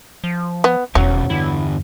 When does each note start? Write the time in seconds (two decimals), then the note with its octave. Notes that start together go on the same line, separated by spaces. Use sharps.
0.24 F3
0.64 B3
0.95 E1 E2 B2 F#3 C#4
1.30 G2 D3 E4